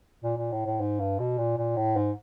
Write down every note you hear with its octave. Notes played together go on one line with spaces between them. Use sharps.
A#2
A#2
A2
A2
G#2
G2
B2
A#2
A#2
A2
G#2